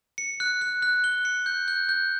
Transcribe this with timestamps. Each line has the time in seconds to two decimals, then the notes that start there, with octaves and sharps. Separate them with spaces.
0.18 C#7
0.40 F#6
0.61 F#6
0.82 F#6
1.04 G7
1.25 C#7
1.46 G6
1.68 G6
1.89 G6